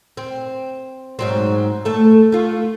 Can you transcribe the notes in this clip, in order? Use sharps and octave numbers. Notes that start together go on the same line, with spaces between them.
C4
G#2 F#3 C4
A3 A4
A3 F4